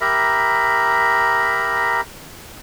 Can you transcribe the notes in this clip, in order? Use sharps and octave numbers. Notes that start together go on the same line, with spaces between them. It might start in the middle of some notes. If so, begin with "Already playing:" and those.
G4 A#4 E5 A#5 B5